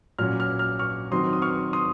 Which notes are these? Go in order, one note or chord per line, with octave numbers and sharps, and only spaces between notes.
A#2 F#3 C#4 F6
F6
F6
C#6 F6
D#3 F#3 C4 C6 D#6
D#6
C#6 F6
C6 D#6